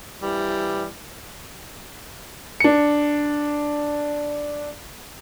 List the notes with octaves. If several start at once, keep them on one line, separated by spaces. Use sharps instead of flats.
E3 G3
D4 C#7